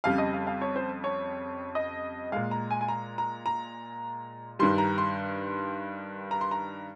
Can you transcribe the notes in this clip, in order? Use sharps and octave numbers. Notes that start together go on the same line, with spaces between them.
F2 C#3 G3 F5
D#5
F5
F5
C#5
C5
C#5
D#5
A#2 G#3 F5
A#5
G#5
G#5
A#5
A#5
A#5
G2 D#3 G3 C6
A#5
C6
A#5
C6
A#5